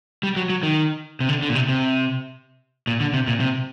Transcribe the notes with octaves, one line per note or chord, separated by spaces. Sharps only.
G3
F#3
F#3
D#3
C3
D3
D3
A#2
C3
C3
A#2
D3
C3
A#2
C3